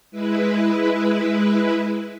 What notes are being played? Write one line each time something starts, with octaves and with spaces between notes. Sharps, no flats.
G#3 E4 B4